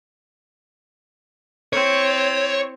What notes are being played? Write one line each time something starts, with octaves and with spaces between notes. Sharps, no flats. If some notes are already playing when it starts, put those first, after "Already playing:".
C4 E4 C#5